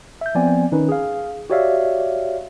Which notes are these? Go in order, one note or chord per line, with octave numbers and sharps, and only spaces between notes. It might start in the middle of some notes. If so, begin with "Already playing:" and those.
E5 G6
F3 B3 C4 D5 G#5
D#3 C#4 D#4 B4
G#4 F5
F#4 G4 C#5 D5 E5 F5